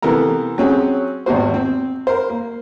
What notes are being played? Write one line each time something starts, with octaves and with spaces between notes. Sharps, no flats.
C3 E3 B3 A4 A#4 A#5
F#3 C4 C#4 G#4
G#1 E2 A#2 F#4 C5
C4
A#4 C5
A#3